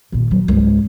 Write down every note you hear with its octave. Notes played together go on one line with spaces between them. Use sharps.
A#2 D#3
F#3
C#2 G#2